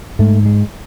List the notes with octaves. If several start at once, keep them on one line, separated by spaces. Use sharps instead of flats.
G#2 A3
G#3